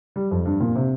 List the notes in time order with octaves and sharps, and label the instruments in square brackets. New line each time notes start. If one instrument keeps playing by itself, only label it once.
[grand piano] G3
F2
G2
A#2
C3